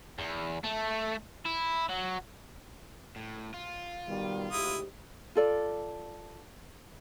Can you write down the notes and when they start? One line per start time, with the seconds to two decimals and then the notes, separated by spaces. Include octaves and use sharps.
0.19 E2
0.64 A3
1.46 E4
1.90 F#3
3.16 A2
3.54 F4
4.07 B2 D#3 G3
4.52 D2 G#2 E4 G4 D#6
5.35 F4 A4 D5